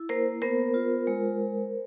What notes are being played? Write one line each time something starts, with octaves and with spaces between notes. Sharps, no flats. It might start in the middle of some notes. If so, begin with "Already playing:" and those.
Already playing: E4
A#3 A#4 C5
B3 A#4 C5
F4
G#3